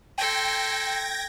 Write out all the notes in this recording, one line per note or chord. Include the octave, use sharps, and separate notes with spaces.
A4 G5 C6 G#6 A#6